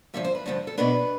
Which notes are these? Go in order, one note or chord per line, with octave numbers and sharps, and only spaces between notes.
G2 D3 F3 E5
C5
B4
G2 D3 F3 A4
A4
B2 B3 D4 B4